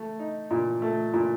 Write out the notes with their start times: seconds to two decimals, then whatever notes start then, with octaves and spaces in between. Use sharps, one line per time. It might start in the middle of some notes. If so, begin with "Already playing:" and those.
Already playing: A3
0.19 D#4
0.51 A#2
0.82 A3
1.14 A#2